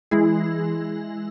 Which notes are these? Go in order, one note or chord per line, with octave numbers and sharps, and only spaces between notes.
E3 G#3 E4 G#4